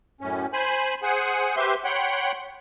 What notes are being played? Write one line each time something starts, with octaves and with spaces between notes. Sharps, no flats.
F#2 A2 C#4
C5 G#5 B5
G#4 C5 F#5 G#5
G4 B4 C5 E5 C6
C#5 F#5 G5 B5 C6